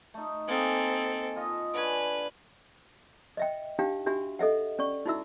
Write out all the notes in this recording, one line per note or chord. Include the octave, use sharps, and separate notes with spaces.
A3 D#4
A#3 C4 G#4 A4
F4 A4 D#5
D3 B4 C#5 G#5
D#5 E5 G5
D4 D#4 G4 F5 G5
D4 F#4 G4 E5 G#5
A4 D#5 E5 F#5
C#4 D5 C#6
D#4 E4 F#4 E5 E6